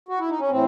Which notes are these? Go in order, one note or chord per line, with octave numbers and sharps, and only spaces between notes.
F#4
E4
D#4
C#4
A2 E3 C4